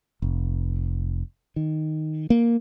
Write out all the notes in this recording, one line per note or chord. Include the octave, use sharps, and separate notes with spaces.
F1
D#3
A#3